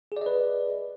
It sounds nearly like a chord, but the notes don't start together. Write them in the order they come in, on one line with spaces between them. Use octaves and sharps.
G#4 D5 D#5 B4